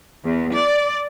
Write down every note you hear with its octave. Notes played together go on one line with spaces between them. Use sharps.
E2
D5